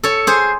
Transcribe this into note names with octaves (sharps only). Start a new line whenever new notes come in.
A4 C#5
G#4 C5